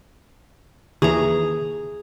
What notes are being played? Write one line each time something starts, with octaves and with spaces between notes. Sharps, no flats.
D#2 E3 G#4 A#5